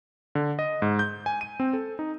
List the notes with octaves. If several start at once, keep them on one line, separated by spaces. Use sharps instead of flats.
D3
D#5
G#2
G6
G#5
D#7
C4
A4
D#4